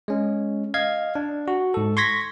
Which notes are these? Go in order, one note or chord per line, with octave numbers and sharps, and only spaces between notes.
G#3 C#4
D#5 F5 G#6
D4
F#4
G#2 A4
C6 C#6 G#6 A#6 B6